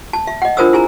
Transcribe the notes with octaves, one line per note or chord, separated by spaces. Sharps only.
A5
E5
D#5 F#5
D4 F4 A#4 C5 D#6 E6
E4 G#4 G#5 A#5